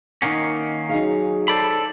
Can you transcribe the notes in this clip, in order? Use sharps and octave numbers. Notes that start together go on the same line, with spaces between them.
D#3 A#3 C#4 D#4 F#5
F#3 D#4 G#4 F5
A4 C5 D5 B5